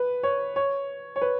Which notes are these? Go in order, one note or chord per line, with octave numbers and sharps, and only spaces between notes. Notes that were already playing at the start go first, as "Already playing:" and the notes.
Already playing: B4
C#5
C#5
C#5
B4